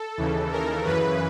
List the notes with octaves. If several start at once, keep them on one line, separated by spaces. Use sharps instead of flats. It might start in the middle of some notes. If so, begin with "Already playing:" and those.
Already playing: A4
D#2 C#3 E3
A#4
F#2 C#3 E3 B4